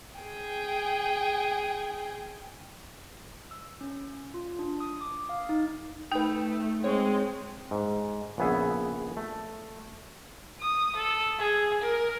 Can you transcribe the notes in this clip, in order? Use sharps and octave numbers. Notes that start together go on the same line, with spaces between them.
G#4 G5
E6
C#4
F4
D4
D#6
D6
F5
D#4
A3 D#4 B4 G5
G#3 C4 C#5
G#2
A#1 C#3 B3 G#4 E5 F#5
A3
D#6
A4
G#4
A#4